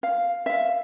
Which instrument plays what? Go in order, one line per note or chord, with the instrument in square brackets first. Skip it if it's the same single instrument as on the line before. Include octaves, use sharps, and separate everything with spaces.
[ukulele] F5
E5 F5